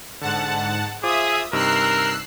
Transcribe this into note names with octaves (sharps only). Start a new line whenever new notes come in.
G#2 D3 F#5 A5
F4 G#4 C5 E5 D6 D#6
G2 C3 D#4 A#4 E6 F#6 C7